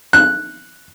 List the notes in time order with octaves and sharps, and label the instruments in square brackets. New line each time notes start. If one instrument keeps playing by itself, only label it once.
[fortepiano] F#6